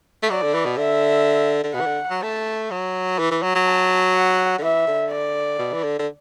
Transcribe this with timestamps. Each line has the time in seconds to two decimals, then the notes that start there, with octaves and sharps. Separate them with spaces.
0.23 A3
0.30 F#3 D5
0.43 D3
0.54 E3
0.65 B2
0.77 D3 E5
1.64 D3
1.74 B2 F#5
1.81 E3
1.86 D3
2.10 F#3
2.22 A3 A5
2.71 F#3
3.19 E3
3.31 E3
3.43 F#3
3.55 F#3
3.67 A5
4.15 F#5
4.58 D3
4.63 E3 E5
4.87 D3
5.11 D5
5.59 B2
5.73 E3
5.83 D3
5.99 D3